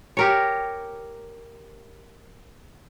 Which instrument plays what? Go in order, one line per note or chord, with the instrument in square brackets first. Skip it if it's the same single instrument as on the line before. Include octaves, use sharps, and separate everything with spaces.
[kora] G4 A#4 C#5